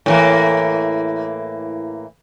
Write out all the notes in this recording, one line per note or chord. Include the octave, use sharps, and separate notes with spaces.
A2 E3 A#3